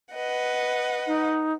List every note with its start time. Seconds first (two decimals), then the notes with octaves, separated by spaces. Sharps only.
0.13 B4 D#5 F#5
1.07 D#4